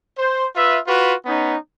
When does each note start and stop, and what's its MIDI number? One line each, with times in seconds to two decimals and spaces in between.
0.18 0.46 72
0.55 0.78 65
0.55 0.78 71
0.55 0.78 76
0.87 1.13 65
0.87 1.13 66
0.87 1.13 71
1.26 1.56 59
1.26 1.56 61
1.26 1.56 63